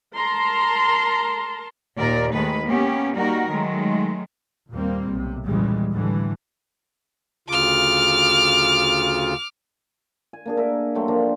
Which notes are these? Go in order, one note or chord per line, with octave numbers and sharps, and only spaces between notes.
A#4 A5 A#5 C6
D#2 A#2 A#4 D5
D#2 D#3 G#3 A3 B4
A#3 B3 C#4 G4
G3 A#3 D#4 F#4 A#4
D#3 F#3 G#3 A3
D#2 A#2 G3 A#3 C4
B1 C3
D#2 A#2 C#3 E3 G3 G#3
A2 D3 E3 G3
D2 C#3 F4 D6 F6
G#5
A#3 D4 G#4
A#4 E5
F#3 A3 G5 C6
F3 A#3 D4